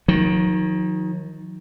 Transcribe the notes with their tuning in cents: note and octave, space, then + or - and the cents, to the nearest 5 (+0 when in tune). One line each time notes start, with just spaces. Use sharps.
D#3 +15 F#3 -40